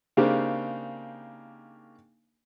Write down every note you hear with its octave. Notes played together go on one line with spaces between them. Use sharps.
C#3 A#3 C4 D4 D#4 G4